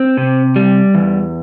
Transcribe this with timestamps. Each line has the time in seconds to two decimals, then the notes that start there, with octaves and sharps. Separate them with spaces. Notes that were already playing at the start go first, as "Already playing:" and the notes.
Already playing: C4
0.17 C3
0.56 G3
0.95 E2